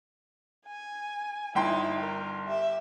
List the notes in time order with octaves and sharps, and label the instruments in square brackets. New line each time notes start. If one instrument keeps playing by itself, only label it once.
[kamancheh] G#5
[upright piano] G1 G5 C6 [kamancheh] D#4 E4
[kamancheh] A#4
G4 E5